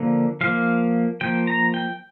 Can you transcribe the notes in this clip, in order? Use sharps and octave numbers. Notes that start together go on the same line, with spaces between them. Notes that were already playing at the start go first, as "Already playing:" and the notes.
Already playing: D3 F3 A#3
F3 A#3 F5
F3 A#3 G5
A#5
G5